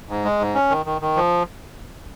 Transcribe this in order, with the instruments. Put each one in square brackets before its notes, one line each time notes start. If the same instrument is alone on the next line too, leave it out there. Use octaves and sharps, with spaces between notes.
[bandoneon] G#2
G#3
G#2
C#4
D#3
D#3
D#3
F3